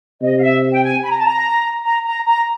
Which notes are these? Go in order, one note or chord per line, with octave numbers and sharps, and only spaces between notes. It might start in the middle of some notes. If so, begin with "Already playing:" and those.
C3 D#5
F5
E5
G5
G#5
B5
A#5
A5
A#5
A#5
A#5
A#5